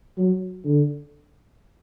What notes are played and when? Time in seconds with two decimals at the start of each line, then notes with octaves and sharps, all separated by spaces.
0.18 F#3
0.65 D3